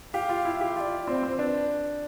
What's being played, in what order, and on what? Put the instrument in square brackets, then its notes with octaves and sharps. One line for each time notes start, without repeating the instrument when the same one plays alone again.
[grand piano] G4 [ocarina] F5
[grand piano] F4
E4
G4
[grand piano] F4 [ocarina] E5
[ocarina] D5
[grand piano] C4 [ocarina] C5 D5
[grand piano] C4
[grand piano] D4 [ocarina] B4